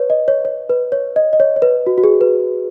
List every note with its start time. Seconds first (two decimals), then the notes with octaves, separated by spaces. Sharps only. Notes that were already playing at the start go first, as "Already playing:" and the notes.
Already playing: B4 C#5
0.10 D#5
0.28 C#5
0.45 C#5
0.70 B4
0.92 C#5
1.16 D#5
1.33 D#5
1.40 C#5
1.56 C#5
1.62 B4
1.87 F#4
1.98 F#4
2.04 G#4
2.21 B4